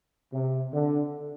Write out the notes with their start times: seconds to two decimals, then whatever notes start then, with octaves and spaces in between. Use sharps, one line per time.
0.32 C3
0.72 D3